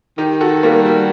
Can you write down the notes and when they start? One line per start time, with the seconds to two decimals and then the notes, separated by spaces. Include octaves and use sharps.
0.18 D#3 D#4 G4
0.41 F#4 A4
0.63 G3 A#3
0.86 G3